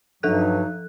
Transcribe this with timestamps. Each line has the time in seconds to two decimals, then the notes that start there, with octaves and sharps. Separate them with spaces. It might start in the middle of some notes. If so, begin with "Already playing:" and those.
0.23 G2 F3 F#3 D#4 A4 F#6